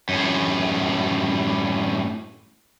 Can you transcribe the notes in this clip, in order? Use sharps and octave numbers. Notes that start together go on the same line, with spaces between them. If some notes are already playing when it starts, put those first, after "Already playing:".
F#2 A2